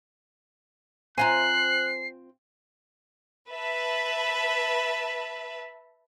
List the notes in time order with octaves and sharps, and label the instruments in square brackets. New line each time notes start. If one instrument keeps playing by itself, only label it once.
[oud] C4 F4 C5 [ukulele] G#5 A#5 [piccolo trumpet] F#6 [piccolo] C7
[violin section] B4 E5 A5